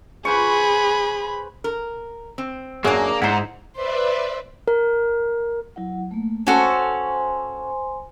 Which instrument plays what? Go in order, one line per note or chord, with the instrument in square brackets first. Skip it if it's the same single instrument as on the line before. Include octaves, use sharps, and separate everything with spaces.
[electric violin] G#4 B5 [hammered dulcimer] B4 C5 C#6
[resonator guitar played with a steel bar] A#4
C4
[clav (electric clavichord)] F#2 F#3 [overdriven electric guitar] A#3 [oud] D4 G#4
[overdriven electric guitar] G#2 [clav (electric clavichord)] E4 C5 [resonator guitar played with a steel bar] F#5 A#5
[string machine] B4 D5 E5 [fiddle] C5
[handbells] A#4
[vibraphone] F#3 E4 F#5
A3 A#3
[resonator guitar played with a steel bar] C#4 F#4 A4 [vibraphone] C5 G#5 C6